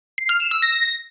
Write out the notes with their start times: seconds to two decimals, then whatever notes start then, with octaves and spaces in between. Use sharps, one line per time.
0.18 C7
0.29 F6
0.40 E7
0.51 E6
0.62 A#6